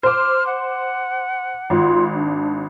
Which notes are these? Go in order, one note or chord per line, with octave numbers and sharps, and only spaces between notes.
C5 D6 F6
F#5
G#1 F4
D4